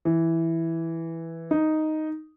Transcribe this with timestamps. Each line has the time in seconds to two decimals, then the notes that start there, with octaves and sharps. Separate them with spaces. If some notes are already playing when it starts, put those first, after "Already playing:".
0.05 E3
1.51 D#4